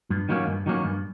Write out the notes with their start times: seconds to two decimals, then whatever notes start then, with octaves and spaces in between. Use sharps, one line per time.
0.10 G2
0.29 D#3 F#3 A#3 C#4
0.47 G2
0.66 D#3 F#3 A#3 C#4
0.85 G2